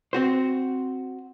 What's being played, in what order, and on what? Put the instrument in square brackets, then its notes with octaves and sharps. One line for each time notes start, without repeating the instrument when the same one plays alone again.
[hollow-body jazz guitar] C4 F#4 C5